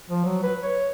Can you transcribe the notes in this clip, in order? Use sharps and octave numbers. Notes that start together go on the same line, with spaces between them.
F3
F#3
B4
C#5